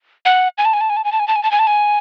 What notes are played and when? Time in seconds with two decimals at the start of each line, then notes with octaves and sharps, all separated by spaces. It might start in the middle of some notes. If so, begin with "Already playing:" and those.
0.25 F#5
0.58 G#5
0.65 A5
0.73 G#5
0.81 A5
0.90 G#5
0.97 A5
1.05 G#5
1.12 A5
1.20 G#5
1.28 A5
1.36 G#5
1.43 A5
1.52 G#5
1.59 A5
1.67 G#5